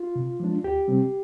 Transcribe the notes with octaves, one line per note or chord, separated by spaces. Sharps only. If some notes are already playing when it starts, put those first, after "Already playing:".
Already playing: F4
C3
F3 G#3 D4
D2 G4
C3 G3 C4